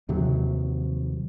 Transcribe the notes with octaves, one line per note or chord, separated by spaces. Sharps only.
D#2 C3 F3 F#3